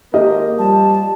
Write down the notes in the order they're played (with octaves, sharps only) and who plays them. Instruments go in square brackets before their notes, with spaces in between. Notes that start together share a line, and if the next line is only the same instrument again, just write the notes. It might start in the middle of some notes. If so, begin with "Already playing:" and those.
[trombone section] G#1 A#3 A#4 [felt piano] G4 D#5
[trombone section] F3 G3 [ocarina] A5